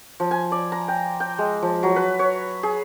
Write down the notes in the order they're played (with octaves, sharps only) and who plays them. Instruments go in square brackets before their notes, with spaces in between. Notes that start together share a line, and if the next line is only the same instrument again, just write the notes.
[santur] F3
G#5
D5
A#5
G5
G5
G#3
F3
F#3
B4
C#5
G#4